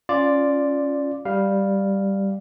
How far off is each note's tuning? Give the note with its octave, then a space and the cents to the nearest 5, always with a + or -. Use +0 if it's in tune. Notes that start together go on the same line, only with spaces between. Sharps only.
C#4 +0 F4 +0 D5 +0
G3 +0 F5 +0